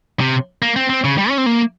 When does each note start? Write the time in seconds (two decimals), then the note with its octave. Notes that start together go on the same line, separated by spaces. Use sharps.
0.20 C3
0.62 A#3
0.76 C4
0.90 C4
1.04 C#3
1.18 G3
1.29 C#4
1.38 C4
1.46 A#3